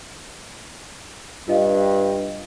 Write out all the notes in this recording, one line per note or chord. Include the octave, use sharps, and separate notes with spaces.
G2 F4 D#5 F5